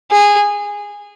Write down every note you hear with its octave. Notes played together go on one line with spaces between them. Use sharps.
G#4